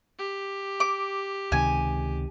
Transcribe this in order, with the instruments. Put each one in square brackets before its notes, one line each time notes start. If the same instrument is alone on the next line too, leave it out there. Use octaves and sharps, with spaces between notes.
[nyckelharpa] G4
[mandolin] D6
[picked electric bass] C#2 C3 D#3 [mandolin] G#5